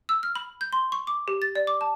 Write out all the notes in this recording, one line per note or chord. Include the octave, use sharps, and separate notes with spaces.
E6
F6
B5
G6
C6
C#6
D6
G4
A6
D5
D6
A5